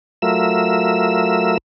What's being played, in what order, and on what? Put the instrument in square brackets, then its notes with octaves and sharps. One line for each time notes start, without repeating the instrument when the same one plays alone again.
[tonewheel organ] F#3 A3 F4 A#4 E5 E6